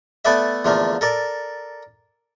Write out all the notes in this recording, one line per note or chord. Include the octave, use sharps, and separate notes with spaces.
A3 B3 A4 B4 D5 E5
E2 D3 F3 A3 A#3
A4 A#4 D5